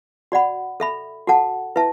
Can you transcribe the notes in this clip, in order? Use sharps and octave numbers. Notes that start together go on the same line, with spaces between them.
F#4 D5 F#5 B5
A4 E5 B5
F#4 A4 F#5 A5
E4 B4 E5 A5